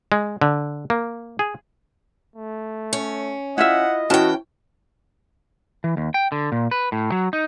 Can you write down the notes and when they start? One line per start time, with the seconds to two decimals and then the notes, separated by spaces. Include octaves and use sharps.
0.12 G#3
0.41 D3
0.90 A#3
1.39 G#4
2.36 A3
2.93 C#4
3.58 E4 F4 D#5 E5 F#5
4.10 E3 C#4 F#4 G5 A5
5.84 E3
5.97 D#2
6.14 G5
6.32 D3
6.52 A#2
6.71 B4
6.92 A2
7.12 F#3
7.33 D#4